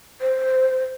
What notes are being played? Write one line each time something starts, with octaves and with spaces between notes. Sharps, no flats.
C5